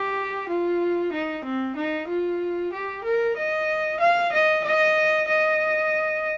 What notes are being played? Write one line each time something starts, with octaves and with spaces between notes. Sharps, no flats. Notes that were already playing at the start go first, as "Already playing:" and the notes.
Already playing: G4
F4
D#4
C4
D#4
F4
G4
A#4
D#5
F5
D#5
D#5
D#5